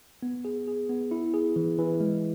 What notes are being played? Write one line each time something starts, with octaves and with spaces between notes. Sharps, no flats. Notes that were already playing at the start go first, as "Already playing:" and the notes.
B3
G#4
G#4
B3
E4
G#4
E3
E3
G#3